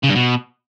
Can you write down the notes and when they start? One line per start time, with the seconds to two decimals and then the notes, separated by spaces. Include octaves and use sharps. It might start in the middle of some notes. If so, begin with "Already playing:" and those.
0.03 C#3
0.09 G2
0.15 B2